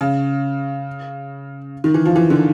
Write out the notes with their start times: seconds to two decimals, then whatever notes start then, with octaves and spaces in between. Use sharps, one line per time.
0.01 C#3
1.84 D#3
1.94 E3
2.05 F3
2.16 E3
2.30 D3